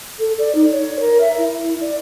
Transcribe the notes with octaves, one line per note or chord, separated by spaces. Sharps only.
A4
D5
D#4
C#5
A#4
E5
E4
D5